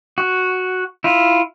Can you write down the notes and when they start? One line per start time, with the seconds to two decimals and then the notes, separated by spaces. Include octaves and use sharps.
0.18 F#4
1.04 E4 F4